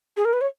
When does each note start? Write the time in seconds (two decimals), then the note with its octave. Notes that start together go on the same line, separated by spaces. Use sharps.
0.17 G#4
0.25 A#4
0.33 B4
0.41 C#5